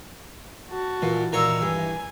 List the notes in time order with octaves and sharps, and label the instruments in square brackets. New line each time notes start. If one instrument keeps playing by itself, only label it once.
[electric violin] F#4 A5
[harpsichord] A#2 [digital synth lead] E3
[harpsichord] A#2 D#3 C#5 [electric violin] A#5 E6
[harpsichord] G2 [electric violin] G#5